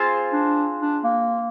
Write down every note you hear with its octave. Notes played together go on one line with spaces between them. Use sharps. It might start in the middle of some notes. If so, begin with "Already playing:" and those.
Already playing: C4 F4 G#4 C5
D4
D4
A#3